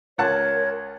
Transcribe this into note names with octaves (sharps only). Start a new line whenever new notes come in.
C#2 A#4 C#5 F#5 A5 G#6